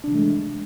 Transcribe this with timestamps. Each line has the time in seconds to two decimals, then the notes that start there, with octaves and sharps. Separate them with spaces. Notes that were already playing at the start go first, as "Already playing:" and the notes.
0.04 D4
0.07 C3
0.11 E3
0.14 A3
0.18 G#3